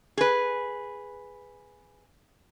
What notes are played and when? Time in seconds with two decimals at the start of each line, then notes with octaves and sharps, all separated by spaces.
0.17 G#4 B4